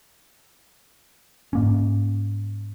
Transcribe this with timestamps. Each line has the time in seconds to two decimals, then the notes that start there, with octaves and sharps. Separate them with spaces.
1.53 G#2 A#3 C#4